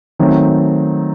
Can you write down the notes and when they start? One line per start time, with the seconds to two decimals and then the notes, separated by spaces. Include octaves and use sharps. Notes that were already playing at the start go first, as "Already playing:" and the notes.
0.19 D#3 F#3 A3 C4